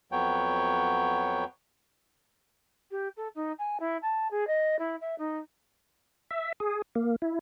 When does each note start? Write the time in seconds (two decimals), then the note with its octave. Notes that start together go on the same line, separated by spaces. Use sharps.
0.12 F2 F#3 B3 C#5 G5
2.91 G4
3.17 A4
3.35 D#4
3.58 G#5
3.80 E4
4.02 A5
4.30 G#4
4.47 D#5
4.79 E4
5.01 E5
5.18 D#4
6.31 E5
6.60 G#4
6.95 A#3
7.22 E4